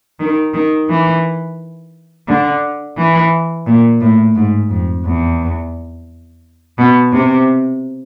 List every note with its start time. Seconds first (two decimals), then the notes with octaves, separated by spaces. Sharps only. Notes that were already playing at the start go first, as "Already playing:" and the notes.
0.20 D#3
0.54 D#3
0.89 E3
2.28 D3
2.97 E3
3.66 A#2
4.01 A2
4.35 G#2
4.70 F2
5.05 E2
6.78 B2
7.12 C3